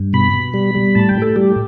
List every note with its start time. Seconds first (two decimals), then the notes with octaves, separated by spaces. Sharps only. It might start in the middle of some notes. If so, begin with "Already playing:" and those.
Already playing: G2
0.13 B2 B5
0.33 B2
0.54 G3
0.75 G3
0.95 A2 A5
1.09 G5
1.15 A2
1.22 A4
1.36 G3 G4